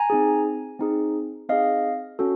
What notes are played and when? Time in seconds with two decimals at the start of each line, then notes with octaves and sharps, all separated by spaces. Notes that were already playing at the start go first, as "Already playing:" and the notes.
Already playing: G#5 A#5
0.10 C4 D#4 G#4
0.79 C4 D#4 G#4
1.49 C4 D#4 G#4 D#5 F5
2.19 C#4 F#4 A4